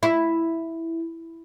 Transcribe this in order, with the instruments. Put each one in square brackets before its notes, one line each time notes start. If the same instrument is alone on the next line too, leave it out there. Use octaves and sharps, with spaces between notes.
[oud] E4